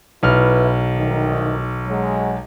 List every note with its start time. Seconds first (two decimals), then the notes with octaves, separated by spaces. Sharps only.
0.23 B1 E4 B4 F6
0.97 C2 D#3
1.88 F#3 G#3